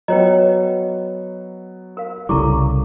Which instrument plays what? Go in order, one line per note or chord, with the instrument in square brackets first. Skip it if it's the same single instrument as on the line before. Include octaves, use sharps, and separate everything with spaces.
[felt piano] F#3 B3 F#4 [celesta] B4 C#5 D#5 [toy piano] G5 A#5
[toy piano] A#4 F5
[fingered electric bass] C2 C#3 G3 [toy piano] E4 A4 C#6 [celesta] A#5 D6